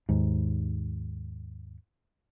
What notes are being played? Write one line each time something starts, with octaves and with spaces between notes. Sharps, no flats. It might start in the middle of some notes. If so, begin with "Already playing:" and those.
D#2 G#2